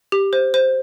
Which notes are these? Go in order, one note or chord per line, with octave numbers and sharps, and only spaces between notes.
G4
C5
C5